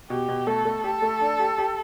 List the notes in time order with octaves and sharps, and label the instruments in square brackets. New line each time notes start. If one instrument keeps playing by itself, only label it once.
[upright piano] B2 [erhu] G4
[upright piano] B2
[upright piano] A3 [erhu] A4
[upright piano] A3
[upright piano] G4 [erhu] A4
[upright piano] A3
D4
G4
G4